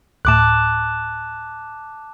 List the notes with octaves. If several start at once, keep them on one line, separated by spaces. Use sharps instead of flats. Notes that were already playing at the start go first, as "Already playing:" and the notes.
D2 A2 A5 D6 F#6